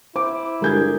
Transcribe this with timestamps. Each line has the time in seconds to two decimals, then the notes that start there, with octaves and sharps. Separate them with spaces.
0.16 E4 C5 D6
0.62 G1 G#3 G#4 A#4 G6 G#6